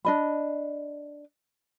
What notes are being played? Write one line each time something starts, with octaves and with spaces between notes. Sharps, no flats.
D4 D#5 B5